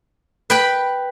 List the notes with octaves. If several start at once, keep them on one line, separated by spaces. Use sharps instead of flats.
B4 G5 B5